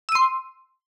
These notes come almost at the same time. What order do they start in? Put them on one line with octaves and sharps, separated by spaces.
E6 D#7 C6